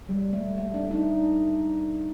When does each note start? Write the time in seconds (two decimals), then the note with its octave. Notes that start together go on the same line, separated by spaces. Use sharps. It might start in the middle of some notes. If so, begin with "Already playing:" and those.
0.09 G3
0.33 A3
0.58 A3
0.74 D4
0.91 D#4